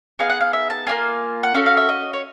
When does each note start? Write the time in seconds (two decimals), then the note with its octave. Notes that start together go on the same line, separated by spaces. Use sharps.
0.19 B3 D#4 G#4 F5
0.30 F#5
0.41 F5
0.53 E5
0.70 A5
0.87 A#3 D4 F4 G#5
1.43 F#5
1.54 C#4 F#4 A4 F5
1.66 F5
1.77 E5
1.89 D#5
2.13 C#5